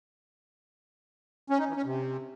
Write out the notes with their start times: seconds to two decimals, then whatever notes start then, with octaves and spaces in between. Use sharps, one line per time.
1.50 C#4
1.59 D#4
1.67 E3
1.76 C#4
1.85 C3